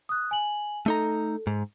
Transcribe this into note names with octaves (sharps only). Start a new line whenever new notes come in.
D#6 F#6
G#5 F#7
A3 D#4 A4 A#5
G#2